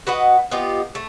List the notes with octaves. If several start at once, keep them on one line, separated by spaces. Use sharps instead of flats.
F#4 B4 D#5 F#5
B3 D#4 F4 G4
A3